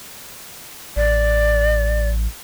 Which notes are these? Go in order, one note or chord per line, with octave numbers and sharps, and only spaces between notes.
A1 D5